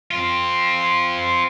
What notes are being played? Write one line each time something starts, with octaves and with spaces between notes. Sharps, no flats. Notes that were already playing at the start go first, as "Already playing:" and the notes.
C4 F4